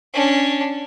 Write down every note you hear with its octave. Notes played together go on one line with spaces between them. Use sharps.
C#4 D4